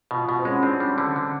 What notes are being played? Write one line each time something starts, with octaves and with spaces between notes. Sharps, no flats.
B2 F4
B2 F#4
C4
G#3 C#4
C4 D4
G3
D3
D3